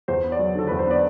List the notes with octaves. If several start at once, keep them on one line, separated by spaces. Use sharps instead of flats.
E2 C5
B3
D5
F#3
D3 A4
B4
E2
C5
B3 D5